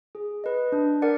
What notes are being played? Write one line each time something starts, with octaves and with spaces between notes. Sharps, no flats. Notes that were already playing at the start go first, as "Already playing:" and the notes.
G#4
B4 D#5
D4
A#4 D5 F#5